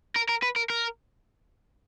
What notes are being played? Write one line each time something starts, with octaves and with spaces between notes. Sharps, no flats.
A#4
A#4
B4
A#4
A#4